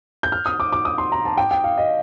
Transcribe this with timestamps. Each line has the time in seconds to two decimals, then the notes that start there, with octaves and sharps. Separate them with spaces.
0.23 G6
0.32 F6
0.46 D#6
0.60 D6
0.72 D6
0.85 D#6
0.98 C6
1.12 A#5
1.25 A5
1.38 G5
1.51 G5
1.64 F5
1.78 D#5